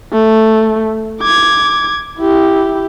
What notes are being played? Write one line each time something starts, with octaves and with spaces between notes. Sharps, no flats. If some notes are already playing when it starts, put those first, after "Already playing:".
A3
D6 G#6
E4 G4